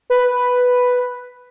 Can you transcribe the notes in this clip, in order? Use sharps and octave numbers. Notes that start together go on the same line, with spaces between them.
B4